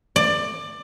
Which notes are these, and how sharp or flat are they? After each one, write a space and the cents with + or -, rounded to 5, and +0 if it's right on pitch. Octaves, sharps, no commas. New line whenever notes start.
D5 +20